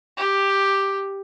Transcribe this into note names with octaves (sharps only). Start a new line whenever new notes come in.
G4